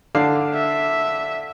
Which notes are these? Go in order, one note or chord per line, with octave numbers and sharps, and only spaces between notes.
D3 D4 F5
E5